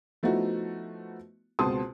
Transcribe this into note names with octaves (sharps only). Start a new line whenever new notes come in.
F3 A3 B3 D#4 E4 F#4
C#2 B2 C4 A5 C6 D#6